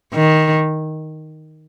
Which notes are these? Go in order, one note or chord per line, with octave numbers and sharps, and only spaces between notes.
D#3